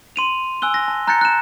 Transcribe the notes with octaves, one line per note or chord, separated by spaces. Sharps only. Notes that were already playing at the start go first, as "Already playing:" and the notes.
C6 D#7 F7
G#5 E6 F#6 G7
A#6
A5
A#5 F#6 G6 A6 A#6 C#7
F#6 E7